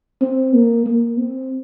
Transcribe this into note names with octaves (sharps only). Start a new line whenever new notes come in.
C4
A#3
A#3
C4